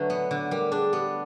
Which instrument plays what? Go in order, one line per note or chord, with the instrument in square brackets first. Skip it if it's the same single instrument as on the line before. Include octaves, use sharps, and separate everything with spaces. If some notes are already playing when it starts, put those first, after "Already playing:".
Already playing: [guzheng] D3 F#3 A3 [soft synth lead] B4
[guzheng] B3
D3
[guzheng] G3 [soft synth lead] A#4
[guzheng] D4 [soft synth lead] G#4
[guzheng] B3 [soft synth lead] G4